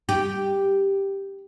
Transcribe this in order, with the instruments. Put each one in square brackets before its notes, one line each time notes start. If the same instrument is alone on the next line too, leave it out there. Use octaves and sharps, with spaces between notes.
[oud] G4